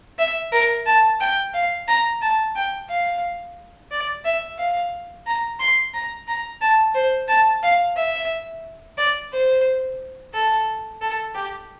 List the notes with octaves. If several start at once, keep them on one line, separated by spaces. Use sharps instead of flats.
E5
A#4
A5
G5
F5
A#5
A5
G5
F5
D5
E5
F5
A#5
C6
A#5
A#5
A5
C5
A5
F5
E5
D5
C5
A4
A4
G4